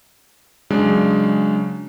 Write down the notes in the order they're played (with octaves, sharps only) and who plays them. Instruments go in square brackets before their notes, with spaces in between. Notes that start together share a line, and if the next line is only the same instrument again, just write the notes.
[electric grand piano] C#3 F#3 G#3 D4